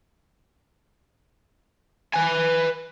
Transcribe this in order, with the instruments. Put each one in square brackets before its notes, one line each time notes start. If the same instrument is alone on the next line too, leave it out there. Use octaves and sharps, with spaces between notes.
[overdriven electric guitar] B4 G#5